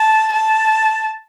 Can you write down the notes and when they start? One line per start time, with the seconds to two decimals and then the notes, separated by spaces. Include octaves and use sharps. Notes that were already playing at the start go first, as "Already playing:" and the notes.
Already playing: A5
0.32 A5